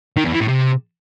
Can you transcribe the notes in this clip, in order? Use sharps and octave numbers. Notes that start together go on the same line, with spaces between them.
D#3
E2
E3
A2
C3